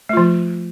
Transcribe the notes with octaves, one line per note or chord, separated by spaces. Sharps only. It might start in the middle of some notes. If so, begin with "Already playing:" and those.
F3 A3 F4